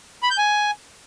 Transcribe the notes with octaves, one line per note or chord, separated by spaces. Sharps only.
B5
G6
G#5